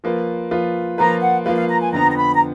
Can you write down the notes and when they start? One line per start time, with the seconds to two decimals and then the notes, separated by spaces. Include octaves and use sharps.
0.04 F3 A#3 F4 B4
0.51 F3 A#3 F4 B4
0.98 F3 A#3 F4 B4 A#5
1.21 F#5
1.46 F3 A#3 F4 B4 F5
1.57 F5
1.69 A#5
1.81 G#5
1.92 F2 D3 F3 B3 A#5
2.11 A#5
2.16 B5
2.36 A#5